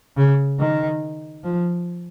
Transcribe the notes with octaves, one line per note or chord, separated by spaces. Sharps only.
C#3
D#3
F3